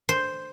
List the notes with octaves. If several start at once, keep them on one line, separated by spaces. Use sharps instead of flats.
C5